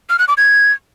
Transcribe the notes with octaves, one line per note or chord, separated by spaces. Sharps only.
F6
F#6
D6
G#6